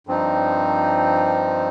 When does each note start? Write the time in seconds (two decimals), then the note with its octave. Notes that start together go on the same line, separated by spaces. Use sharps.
0.07 G2 F3 C4 D#4